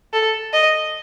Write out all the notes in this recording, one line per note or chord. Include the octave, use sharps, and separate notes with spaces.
A4
D#5